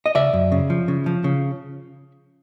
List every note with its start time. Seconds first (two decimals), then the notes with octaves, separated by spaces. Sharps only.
0.06 D#5
0.15 C#3 D5 E5
0.33 F#2
0.52 C#3
0.70 F3
0.88 C#3
1.06 F3
1.24 C#3